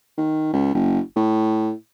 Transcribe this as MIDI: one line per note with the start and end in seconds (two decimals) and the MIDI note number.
0.17 0.51 51
0.53 0.70 37
0.74 0.99 30
1.16 1.71 45